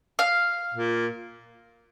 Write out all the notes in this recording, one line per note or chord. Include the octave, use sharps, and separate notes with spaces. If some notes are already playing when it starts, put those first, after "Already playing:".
F5
A#2